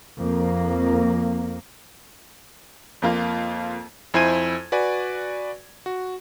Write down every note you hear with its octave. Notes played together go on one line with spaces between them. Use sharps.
F2 A#3
F2 A#3 F4
F2 E4 C5 G#5 G#6 D#7
F#4 B4 D5 G#5
F#4